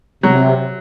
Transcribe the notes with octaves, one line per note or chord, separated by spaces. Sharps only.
C3 F#3